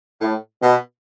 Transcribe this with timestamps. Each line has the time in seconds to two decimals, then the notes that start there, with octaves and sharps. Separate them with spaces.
0.21 A2
0.62 B2